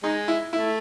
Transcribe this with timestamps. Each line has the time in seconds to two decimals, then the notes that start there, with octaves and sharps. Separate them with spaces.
0.03 G#3 D#4
0.28 E4
0.53 A3 E4